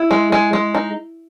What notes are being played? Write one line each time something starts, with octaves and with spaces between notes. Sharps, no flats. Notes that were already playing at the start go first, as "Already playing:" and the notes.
Already playing: E4
G#3
G#3
G#3
D#4